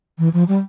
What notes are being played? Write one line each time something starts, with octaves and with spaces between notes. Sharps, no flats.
E3
F3
G3